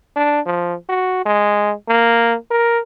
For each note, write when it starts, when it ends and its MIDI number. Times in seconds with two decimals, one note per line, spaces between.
0.16 0.40 62
0.46 0.75 53
0.89 1.23 66
1.26 1.73 56
1.88 2.36 58
2.51 2.79 70